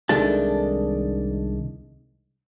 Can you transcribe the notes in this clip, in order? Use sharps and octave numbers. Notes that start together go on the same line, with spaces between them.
C2 D#3 G#3 D4 A4 A5